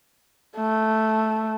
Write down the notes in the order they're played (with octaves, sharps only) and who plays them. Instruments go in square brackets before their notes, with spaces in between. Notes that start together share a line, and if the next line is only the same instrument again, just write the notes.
[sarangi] A3